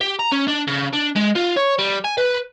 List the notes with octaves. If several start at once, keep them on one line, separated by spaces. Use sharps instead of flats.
G4
A#5
C#4
D4
C#3
D4
G#3
F4
C#5
G3
G#5
B4